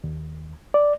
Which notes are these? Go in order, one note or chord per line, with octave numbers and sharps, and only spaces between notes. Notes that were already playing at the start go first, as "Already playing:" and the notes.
D#2
D5